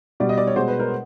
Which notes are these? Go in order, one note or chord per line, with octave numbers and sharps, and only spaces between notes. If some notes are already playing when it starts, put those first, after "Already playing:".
B2 G3 D5
D#5
D5
C#5
B2 G#3 C5
B4
A#4